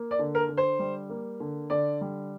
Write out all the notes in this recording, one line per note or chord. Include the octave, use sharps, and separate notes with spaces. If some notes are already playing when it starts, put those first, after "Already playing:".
Already playing: A#3
D5
D3
A#4
D3
C5
G3
A#3
D3
D3 D5
G3